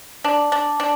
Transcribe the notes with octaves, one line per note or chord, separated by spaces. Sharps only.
D4
D4
D4